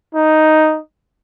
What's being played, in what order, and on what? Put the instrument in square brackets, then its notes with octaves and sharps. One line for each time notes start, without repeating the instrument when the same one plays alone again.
[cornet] D#4